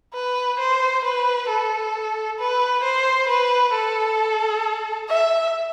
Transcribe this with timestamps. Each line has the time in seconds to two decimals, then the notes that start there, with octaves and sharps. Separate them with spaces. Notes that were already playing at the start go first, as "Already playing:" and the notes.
0.14 B4
0.59 C5
1.04 B4
1.49 A4
2.39 B4
2.83 C5
3.29 B4
3.73 A4
5.09 E5